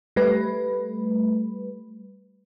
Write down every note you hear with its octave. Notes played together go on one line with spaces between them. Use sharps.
G3 A3 B4